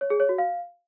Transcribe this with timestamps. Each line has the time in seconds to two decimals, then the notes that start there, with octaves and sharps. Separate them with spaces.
0.01 C#5
0.10 G#4
0.20 C#5
0.29 F#4
0.38 F5